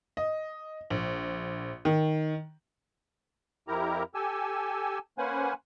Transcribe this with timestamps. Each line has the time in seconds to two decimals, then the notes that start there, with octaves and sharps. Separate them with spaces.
0.17 D#5
0.90 A#1
1.85 D#3
3.68 F2 E4 G4 A#4 A#5
4.15 G4 A4 G#5 E6
5.18 A#3 C#4 B4 C5 F#5 G#5